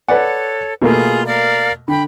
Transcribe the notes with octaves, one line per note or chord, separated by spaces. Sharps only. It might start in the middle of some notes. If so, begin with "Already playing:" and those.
A4 B4 C#5 D5 F#5
B2 A3 A#3 F4 G#4
A#4 D5 F5
D3 G5 B5